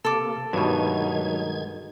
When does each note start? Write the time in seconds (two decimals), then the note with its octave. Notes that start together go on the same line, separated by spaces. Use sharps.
0.05 C3 A#3 A4 D6
0.53 G2 B2 D#3 F#3 G#3 A3 D#4 G#6